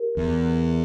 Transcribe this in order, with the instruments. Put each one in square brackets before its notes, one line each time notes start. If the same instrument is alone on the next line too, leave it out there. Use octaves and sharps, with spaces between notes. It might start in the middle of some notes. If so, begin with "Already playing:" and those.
Already playing: [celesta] G4 A#4
[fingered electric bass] E2